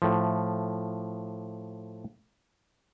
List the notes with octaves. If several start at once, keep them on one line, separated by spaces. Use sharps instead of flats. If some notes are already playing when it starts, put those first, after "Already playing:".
A2 F3